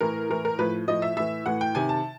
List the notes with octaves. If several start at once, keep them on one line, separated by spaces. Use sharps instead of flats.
A2 E3 A#4
A2 E3 A#4
A#4
A2 F3 B4
A2 F3 D#5
E5
A2 E3 E5
A2 E3 F#5
G5
C3 D#3 G#5
A5